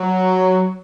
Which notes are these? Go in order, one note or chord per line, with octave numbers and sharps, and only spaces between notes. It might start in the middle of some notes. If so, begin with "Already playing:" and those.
Already playing: F#3